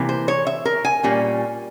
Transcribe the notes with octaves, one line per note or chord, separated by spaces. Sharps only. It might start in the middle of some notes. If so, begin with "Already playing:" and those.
Already playing: C3 E3 A#3
C5
C#5
E5
A#4
G#5
A#2 G3 A#3 C#4